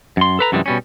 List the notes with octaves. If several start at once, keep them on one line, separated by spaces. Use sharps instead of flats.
F#2 C6
A4 B4 A#5
F#2 C3 E3 G3 G#3
B2 G3 C#4